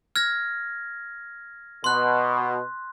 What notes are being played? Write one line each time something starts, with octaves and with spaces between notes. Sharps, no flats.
F6 G#6 A#6
B2 C6 F#6